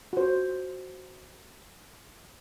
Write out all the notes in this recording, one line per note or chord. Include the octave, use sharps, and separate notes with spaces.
F#4 C5